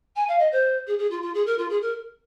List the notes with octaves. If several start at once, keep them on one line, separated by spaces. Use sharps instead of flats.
G#5
F5
D#5
C5
G#4
G#4
F4
F4
G#4
A#4
F4
G#4
A#4